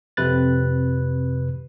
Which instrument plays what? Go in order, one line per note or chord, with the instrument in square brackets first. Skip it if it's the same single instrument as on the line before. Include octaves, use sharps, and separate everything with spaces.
[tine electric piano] F2 C3 B4 F#6 A6